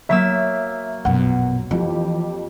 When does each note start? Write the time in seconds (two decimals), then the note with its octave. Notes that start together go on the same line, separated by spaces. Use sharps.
0.09 F#3 A#3 E5 E6 B6
1.05 A#1 F#2 B2 F#5
1.71 F2 E3 G4